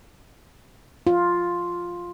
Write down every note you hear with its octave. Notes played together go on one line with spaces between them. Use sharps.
F4